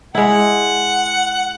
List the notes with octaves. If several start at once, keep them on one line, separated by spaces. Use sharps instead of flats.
G#3 E4 F#5